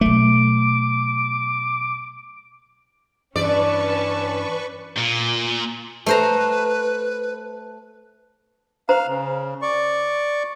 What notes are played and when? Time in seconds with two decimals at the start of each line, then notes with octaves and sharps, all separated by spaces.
0.01 B2 F#3 A3 D6
3.36 G2 E3 C#4 B4 D5 A5 C#6
4.97 A#2
6.06 A3 B4 C5 A#5
8.89 C5 F5 A#5
9.08 C#3
9.62 D5 C#6